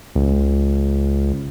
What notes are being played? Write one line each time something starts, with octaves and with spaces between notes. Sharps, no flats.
C#2